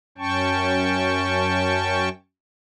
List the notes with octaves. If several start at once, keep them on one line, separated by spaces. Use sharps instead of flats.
F#2 C#4 G5 A5 C#6